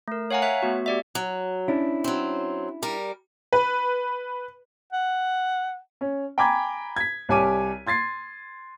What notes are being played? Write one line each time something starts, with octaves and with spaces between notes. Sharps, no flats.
A3 A#4
C#5 F5 F#5 G#5 A#5
C#5 E5 F#6
A3 B3 F#4
G4 D5 E5
F#3
C#4 D4 E4
F#3 C4
G3 A#4
B4
F#5
C#4
G5 G#5 A#5 B5 D6 G#6
G#6 B6
C2 G3 C#5 G#5 D6 D#7
C6 G#6 A6 C7